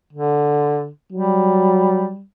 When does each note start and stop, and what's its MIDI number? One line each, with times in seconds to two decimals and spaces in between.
0.13 0.89 50
1.12 2.11 54
1.12 2.23 55